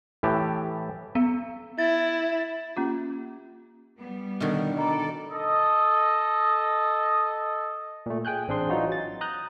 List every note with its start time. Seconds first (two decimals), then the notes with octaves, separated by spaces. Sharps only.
0.23 A2 E3 G4 A5
1.15 B3
1.78 E4 A6
2.76 A#3 C#4 F4 G4
3.99 G3 B3
4.40 B2 D3 D#3
4.76 A4 D5 D#5 A#5 B5
5.31 A4 D#5
8.06 A#2 A3
8.25 G#4 G5 G#5 F#6 G6
8.48 A1 C4 D4 G#4 C6
8.69 E3 F#3 D#4 F4 F#4
8.92 A6
9.21 A#5 D#6 F#6 G6